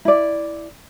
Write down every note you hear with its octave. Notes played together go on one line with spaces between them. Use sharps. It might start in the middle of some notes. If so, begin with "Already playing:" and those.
E4 D5